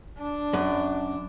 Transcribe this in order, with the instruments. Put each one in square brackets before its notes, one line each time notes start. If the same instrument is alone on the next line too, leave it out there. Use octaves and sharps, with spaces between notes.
[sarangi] D4
[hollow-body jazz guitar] F#2